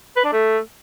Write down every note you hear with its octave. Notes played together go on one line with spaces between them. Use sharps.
B4
D4
A3